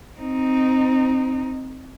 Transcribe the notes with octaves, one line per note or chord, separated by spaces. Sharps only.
C4 D#4